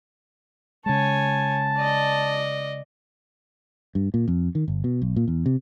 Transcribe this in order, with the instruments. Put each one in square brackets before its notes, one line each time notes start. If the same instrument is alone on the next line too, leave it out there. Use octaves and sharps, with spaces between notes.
[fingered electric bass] C#3 G#3 [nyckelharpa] C#5 G#5 [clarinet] A5
[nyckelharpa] D5 D#5
[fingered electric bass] G2
A#2
F2
D#3
G1
B2
B1
A#2
E2
C3